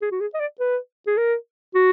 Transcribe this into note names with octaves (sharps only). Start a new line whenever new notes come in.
G#4
F#4
G#4
D#5
D5
B4
G#4
A#4
F#4